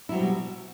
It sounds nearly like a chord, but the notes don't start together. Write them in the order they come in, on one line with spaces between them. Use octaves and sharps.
E4 F#3 C4 G3 B2